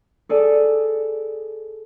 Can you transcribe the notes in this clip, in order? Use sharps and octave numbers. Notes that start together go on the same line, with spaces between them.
G#4 A4 D5 G#5